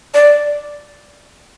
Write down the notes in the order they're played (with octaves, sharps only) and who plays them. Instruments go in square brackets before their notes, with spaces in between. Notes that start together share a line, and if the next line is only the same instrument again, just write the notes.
[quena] D5